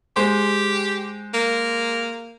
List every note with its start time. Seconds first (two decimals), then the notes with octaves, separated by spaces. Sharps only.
0.16 G#3 G4 C5
1.34 A#3